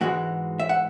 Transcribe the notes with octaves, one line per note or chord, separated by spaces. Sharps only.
G#2 E3 G#3 F#4
E5
F#5